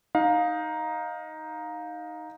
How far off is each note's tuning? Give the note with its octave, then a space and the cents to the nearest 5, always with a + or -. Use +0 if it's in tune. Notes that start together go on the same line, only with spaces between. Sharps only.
D#4 +5 F5 +25